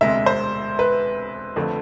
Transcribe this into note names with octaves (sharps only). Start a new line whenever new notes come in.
E1 D2 C3 G#3 C4 E5
C5
B4
F2 D3 A3 C4